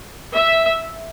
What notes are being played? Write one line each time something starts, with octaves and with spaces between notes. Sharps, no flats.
E5